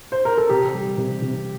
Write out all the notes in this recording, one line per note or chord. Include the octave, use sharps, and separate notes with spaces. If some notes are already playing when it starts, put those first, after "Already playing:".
C5
A#4
A4
C3 G4
G3
C3
C3